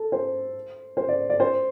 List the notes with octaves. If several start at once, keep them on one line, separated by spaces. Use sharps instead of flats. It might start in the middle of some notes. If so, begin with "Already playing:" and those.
Already playing: A4
C5
C5
D5
D5
C5